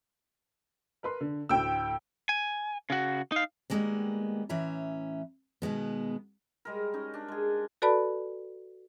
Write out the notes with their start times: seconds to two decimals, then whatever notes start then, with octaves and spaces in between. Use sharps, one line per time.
1.03 A#4 B4 C6
1.21 D3
1.49 D2 A2 G5 E6
2.29 G#5
2.90 C#3 F#4
3.32 D#4 F5
3.70 D#3 F3 G3 G#3 A#3 B3
4.49 A2 E3 C#4 E5 A#5
5.62 B2 D#3 G#3 B3
6.65 G3 G#3 A#4
6.93 C#4 D#4
7.14 D4
7.28 G#3 G#4
7.82 F#4 A4 B4 D5 A5 B5